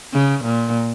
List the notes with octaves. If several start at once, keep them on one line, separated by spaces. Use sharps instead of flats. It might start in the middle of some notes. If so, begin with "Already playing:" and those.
C#3
A#2